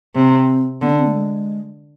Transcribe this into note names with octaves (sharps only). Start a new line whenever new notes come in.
C3 C4
D3 B3
D4
C4
A3
G#3